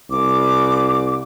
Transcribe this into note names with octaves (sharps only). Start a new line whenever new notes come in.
C2 D6